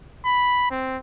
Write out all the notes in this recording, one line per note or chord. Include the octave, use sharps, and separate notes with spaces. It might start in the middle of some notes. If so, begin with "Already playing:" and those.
B5
C4